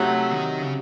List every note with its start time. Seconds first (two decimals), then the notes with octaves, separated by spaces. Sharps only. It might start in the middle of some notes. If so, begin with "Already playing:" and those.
Already playing: C3 F#3 A3 C4 D#4
0.31 D#3
0.62 C#3